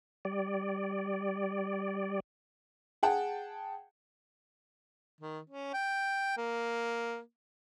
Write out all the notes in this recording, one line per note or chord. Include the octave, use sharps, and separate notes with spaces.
G3 D5
G#4 F#5 G5 A5
D#3
C#4
G5
A#3